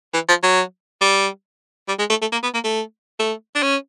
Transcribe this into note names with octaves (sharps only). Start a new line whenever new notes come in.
E3
F3
F#3
G3
G3
G#3
A3
A3
A#3
B3
A#3
A3
A3
D4
C#4